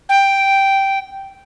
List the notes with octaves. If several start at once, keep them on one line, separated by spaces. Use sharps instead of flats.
G5